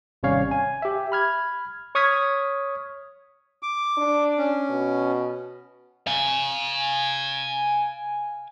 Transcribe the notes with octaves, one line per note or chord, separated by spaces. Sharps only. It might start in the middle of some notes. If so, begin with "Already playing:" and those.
G#1 C3 G3 C#4 C#5 F5
G#5
G4 E5
B5 F6 G#6
C#5 C#6 D#6 F6 G#6 B6
D6
D4
C#4
B2
F5 G#5